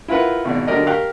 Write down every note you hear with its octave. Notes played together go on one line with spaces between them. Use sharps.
E4 F4 A#4 B4 F#5
G#1 B2 D5
D3 F#3 G4 A#4 D5 D#5
G4 A#4 F5 F6 F#6